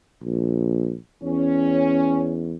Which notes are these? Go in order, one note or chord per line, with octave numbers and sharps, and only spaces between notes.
A#1
E2 C#4